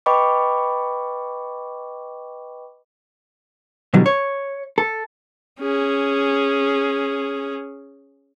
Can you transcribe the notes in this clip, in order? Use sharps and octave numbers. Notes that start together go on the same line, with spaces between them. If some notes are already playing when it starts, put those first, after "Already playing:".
B4 D#5 G5 B5 C#6 D6
B2 D3 E3 F#3 G3
C#5
A4
C#4 G#4